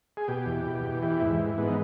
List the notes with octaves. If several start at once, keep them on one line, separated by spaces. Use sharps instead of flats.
G#4
B2 G4
E2
B2
E2
E3 G4
G#2 E4
E3
G#2 B3
D#4